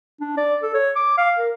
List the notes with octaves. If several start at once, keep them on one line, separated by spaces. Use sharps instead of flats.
D4
D5
A4
C#5
D6
F5
A#4